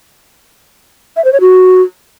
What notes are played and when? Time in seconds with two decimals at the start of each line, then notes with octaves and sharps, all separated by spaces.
1.17 E5
1.25 C5
1.33 C#5
1.41 F#4